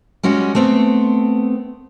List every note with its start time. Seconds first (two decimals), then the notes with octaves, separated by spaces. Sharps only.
0.23 G3 G#3 C#4 F#4
0.55 A3 B3 C4